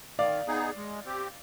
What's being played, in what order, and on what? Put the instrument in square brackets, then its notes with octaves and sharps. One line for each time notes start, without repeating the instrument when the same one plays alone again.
[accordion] D#3 [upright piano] D5 F5
[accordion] B3 D#4 G#4
G#3
C4 G4